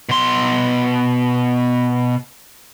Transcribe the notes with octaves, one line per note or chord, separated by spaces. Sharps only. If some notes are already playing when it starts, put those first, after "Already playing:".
B2 C6